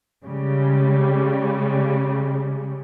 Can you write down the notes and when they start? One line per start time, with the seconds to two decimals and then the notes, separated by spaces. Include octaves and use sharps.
0.24 C#3 G3 G#3